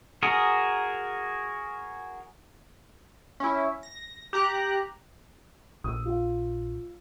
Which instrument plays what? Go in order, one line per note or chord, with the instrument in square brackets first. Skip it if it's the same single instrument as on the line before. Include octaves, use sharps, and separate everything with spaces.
[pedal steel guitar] F#4 G#4 A#4
[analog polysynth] C#4 E4
A#6
G4 A#5 F#6
[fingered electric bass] A#1 [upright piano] D#6 E6
[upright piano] F4 F5